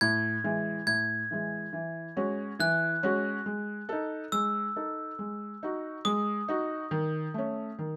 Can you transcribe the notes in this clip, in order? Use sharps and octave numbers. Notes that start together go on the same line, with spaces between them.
A2 G#6
E3 G#3
A2 G#6
E3 G#3
E3
G#3 C#4 F#4
E3 F#6
G#3 C#4 F#4
G#3
D#4 A4
G#3 E6
D#4 A4
G#3
D#4 F#4
G#3 D#6
D#4 F#4
D#3
A3 C#4
D#3